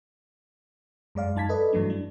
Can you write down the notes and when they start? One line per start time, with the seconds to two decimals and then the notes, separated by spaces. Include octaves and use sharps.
1.15 F#2 G#3 D5 F5
1.36 F#2 D#4 A5 G#6 B6
1.49 A4 B4 D5 D#5
1.73 G2 E3 F#3 A3 D4
1.90 D4